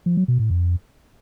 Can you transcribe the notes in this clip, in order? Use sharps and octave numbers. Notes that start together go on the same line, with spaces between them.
F3
F#3
B2
A2
F2